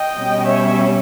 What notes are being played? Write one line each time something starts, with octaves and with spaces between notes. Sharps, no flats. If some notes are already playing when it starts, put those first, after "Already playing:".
Already playing: D#5 G5
B2 G3 C#4
C#5 E5